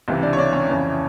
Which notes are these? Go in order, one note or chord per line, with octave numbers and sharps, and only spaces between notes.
C#2 C3 E3
D4 D5
C#5
D4 D5
C#4 C#5
F2 C#3 E3